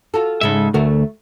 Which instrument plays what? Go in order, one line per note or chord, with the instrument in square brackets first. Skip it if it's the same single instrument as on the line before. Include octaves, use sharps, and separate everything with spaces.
[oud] F4 F#4 A4
[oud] G#2 C#3 G#3 [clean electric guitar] A4 E5
[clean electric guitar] D2 [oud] A3 F#4 A#4